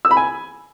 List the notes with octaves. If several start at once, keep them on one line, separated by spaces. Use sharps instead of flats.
E6
B5
G#5